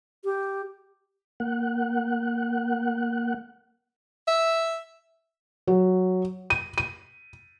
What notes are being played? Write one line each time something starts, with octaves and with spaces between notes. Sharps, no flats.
G4
A#3 F#5
E5
F#3
D#7
D#7